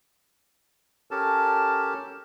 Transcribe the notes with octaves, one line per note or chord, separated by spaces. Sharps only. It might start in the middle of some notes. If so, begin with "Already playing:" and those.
C#4 G4 A4 A#4 A5